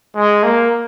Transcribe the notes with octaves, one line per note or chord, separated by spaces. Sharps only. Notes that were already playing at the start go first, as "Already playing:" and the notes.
G#3
A#3